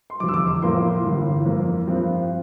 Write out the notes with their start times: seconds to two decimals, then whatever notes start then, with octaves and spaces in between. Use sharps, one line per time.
0.10 C6
0.20 F1 E2 D3 F3 D6
0.28 E6
0.34 D6
0.47 D6
0.62 A2 F3 A#3 E4 C6
1.03 G1 G2 E3
1.45 F2 E3 A#3 F4
1.87 G2 F3 C4 F4